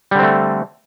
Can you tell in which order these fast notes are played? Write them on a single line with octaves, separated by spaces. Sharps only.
G3 D3 C4 A3